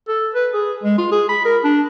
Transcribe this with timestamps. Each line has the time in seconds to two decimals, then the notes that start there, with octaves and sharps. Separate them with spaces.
0.08 A4
0.34 B4
0.53 G#4
0.84 G#3
0.98 F4
1.11 G#4
1.29 B5
1.45 A#4
1.64 D4